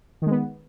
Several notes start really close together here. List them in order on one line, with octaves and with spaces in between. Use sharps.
D#3 G#3 B3